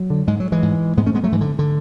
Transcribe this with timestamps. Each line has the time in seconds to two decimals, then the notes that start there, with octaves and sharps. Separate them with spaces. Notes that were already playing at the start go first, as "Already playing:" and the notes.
Already playing: F#3
0.10 D3
0.28 G#2 G#3
0.40 F#3
0.52 E3 G#3
0.62 G#2
0.97 G#2 G#3 B3
1.06 A3 C#4
1.15 G#3 B3
1.24 F#3 A3
1.32 G#2 E3
1.41 D3
1.59 D3